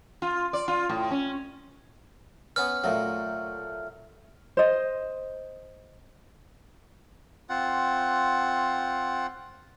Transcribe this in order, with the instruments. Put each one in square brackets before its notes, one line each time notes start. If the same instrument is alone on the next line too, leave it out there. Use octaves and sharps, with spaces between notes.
[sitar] F4
D5
F4
A2
C#4
[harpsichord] B3 C#4 B4 [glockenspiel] F6
[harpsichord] A#2 F#3 [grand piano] A3
[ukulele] C5 D#5
[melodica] C4 F4 F#5